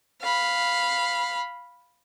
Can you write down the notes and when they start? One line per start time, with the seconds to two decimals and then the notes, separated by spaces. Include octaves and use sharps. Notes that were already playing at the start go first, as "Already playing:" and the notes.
0.22 F5 B5